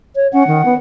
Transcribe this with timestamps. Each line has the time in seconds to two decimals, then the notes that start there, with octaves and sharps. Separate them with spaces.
0.15 C#5
0.33 C#4 F#5
0.47 D#3
0.65 B3